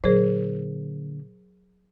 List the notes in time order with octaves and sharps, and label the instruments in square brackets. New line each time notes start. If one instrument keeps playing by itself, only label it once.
[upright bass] A#2 D3 [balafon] F#3 [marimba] G#4 A#4 C5